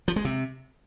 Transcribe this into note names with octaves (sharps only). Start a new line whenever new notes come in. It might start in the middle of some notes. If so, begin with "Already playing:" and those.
F3
G#3
C3